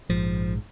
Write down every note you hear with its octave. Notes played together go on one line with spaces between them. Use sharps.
A#1 G#2 F3